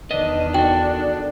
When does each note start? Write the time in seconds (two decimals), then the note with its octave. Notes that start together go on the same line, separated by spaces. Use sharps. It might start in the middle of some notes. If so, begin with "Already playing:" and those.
0.11 E2 D#3 D4 B4 D#5
0.54 F#4 A4 G5